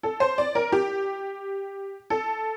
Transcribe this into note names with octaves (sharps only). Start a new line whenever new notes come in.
A4
C5
D5
A#4
G4
A4